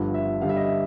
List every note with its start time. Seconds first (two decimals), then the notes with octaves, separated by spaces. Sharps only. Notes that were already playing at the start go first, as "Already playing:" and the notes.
Already playing: G1 G2 D3 F3
0.14 E5
0.41 G2 D3 G3 F5
0.49 E5
0.56 D#5
0.64 E5